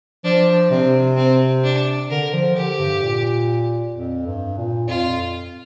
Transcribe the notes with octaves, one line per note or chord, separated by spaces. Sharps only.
F3 D4
C3 C4
C4
D4
D3 A#4
F3
D3 G4
G2
A#2
F2
G2
A#2
F2 F4